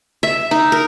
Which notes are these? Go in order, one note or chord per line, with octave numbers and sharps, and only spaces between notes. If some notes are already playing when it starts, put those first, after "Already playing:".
E5
D#4
A#4